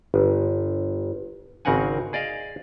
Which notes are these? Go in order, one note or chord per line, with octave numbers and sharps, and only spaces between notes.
G1
G#1 C#3 C4 A#4 F#5 G#5
G#4 D5 D#5 F5